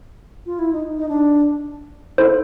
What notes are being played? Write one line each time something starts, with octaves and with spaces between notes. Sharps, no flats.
F4
E4
D#4
D#4
D4
D#4 E4 A4 C5